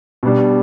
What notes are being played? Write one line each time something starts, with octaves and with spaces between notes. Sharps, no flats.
B2 G3 D4